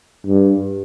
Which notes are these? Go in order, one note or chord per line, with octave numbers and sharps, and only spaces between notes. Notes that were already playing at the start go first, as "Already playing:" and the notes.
G2